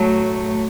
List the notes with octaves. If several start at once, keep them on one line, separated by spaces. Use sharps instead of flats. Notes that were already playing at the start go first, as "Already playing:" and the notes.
Already playing: A2 F#3 A3